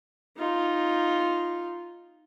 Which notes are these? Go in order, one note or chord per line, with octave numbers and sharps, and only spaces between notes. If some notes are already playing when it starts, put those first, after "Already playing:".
D#4 F4